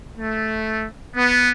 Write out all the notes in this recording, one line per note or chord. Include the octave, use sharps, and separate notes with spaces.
A3
B3